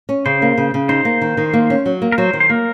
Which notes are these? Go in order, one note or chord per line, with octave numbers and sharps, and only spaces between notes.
C#4
C#3 C5
A#3
C#3
C#3
D#4 C5
A#3
D#3
D#3
A#3
C#4
F#3
A#3
A#4
F#3 C5
D#3
C5
A#3 A#4